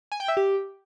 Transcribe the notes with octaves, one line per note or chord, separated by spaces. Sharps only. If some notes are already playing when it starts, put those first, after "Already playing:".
G#5
G5
E5
G4